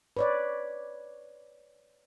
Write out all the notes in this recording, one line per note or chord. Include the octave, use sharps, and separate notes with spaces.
B4 C#5 D5